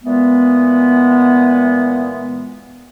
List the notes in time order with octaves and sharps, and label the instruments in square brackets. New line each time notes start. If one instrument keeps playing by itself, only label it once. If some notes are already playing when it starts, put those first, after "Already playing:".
[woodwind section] A#2 E3 G#3 B3